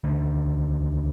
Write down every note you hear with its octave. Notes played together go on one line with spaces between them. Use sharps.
D2 D3 D#3 A3